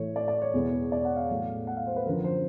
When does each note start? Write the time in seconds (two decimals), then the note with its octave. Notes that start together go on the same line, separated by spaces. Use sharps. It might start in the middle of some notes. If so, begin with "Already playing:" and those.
Already playing: A2 E3 A3 C#5
0.16 D5
0.28 D5
0.42 C#5
0.54 E2 B2 G#3 B3
0.92 D5
1.05 F#5
1.17 F5
1.30 A2 F#3 A3
1.67 F#5
1.77 F5
1.87 C5
1.96 B4
2.06 F#2 D3 F3 A#4
2.24 C5